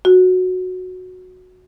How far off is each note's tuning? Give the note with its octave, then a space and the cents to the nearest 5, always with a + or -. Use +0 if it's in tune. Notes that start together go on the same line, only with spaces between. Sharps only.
F#4 -10